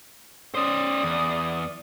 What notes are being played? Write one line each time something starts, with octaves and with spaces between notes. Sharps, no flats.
C#4 C5 D5 D#6
E2